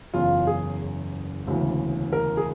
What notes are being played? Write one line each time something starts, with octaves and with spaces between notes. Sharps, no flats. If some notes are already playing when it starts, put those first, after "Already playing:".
F#1 E2 C#3 F4
G#4
E1 D2 C#3 E3
A#4
G#4